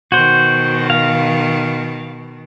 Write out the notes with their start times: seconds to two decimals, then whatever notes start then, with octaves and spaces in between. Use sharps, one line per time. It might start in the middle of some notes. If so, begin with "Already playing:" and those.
0.12 B2 D#3 F#4 C5
0.90 F5